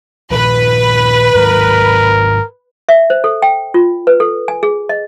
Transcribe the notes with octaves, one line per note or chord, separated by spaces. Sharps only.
A#2 D#3 F3 B4
G#2 D#3 F#3 A#4
E5
C5
A4
G5
F4
B4
A4
G#5
G#4
D#5